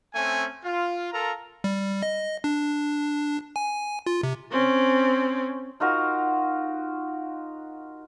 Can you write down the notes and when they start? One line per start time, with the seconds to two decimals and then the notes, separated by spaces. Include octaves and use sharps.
0.14 A3 C4 C#4 G#5
0.64 F4
1.12 F4 A4 A#4 A#5
1.64 G3
2.03 D#5
2.44 D4
3.56 G#5
4.06 F4
4.23 C3
4.51 C4 C#4
5.80 D#4 F4 F#4 A#4